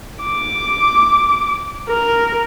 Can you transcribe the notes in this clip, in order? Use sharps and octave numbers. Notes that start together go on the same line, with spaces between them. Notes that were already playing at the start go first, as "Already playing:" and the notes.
D6
A#4